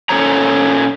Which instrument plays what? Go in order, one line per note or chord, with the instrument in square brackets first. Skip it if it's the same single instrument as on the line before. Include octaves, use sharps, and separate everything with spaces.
[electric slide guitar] A#2 C#4 A4 C5 C#5 A#5